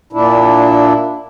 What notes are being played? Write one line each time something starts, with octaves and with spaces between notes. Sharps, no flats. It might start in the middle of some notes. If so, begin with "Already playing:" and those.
A#2 D4 E4